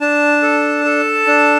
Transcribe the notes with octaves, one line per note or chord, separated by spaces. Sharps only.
D4 A5
A4
A4
D4